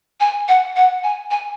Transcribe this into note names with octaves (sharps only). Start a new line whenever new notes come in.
G#5
F#5
F#5
G#5
G#5